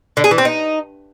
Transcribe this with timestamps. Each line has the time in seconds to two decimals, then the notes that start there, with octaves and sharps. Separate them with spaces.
0.17 D3
0.24 G#4
0.31 E3
0.38 C4
0.45 D#4